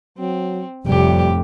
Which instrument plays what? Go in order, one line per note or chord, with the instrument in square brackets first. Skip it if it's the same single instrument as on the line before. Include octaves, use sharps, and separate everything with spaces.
[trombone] F#3 [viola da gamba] C4
[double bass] F1 F2 [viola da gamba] A2 C3 G4 [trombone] G3